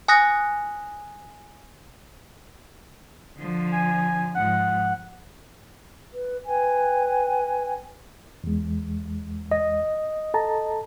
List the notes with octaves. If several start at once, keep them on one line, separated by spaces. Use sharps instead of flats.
G#5 D#6 F#6 A#6
D3 F3
G#5
G#2 F3 F#5
B4
B4 G5 G#5
E2 G#3
D#5
A4 A5 A#5